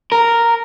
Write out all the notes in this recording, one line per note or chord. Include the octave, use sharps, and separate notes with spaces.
A#4